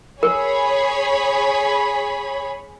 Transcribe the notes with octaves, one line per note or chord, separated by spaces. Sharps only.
G#4 A#4 C#5 B5